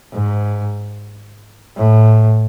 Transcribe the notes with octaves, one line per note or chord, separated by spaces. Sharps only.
G#2
A2